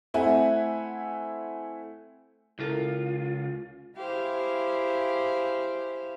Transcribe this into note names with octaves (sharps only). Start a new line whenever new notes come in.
A3 C4 E4 E5 F#5 G#5
C#2 E4 F4 A4 A#4
E4 G4 G#4 C5 F5